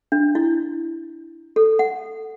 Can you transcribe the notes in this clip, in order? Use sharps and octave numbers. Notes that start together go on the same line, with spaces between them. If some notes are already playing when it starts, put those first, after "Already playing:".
D4
E4
A4
F#5